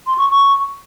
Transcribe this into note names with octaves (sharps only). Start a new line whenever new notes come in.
C6
C#6
C#6